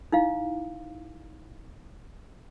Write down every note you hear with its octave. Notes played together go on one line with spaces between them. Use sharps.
D#4 E4 F5